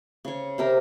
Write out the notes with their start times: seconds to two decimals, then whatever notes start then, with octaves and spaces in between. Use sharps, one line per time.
0.25 C#3 C#5
0.58 C3 G4 A#4